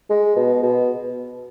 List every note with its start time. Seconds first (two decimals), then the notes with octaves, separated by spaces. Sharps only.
0.10 G#3
0.36 B2
0.63 B2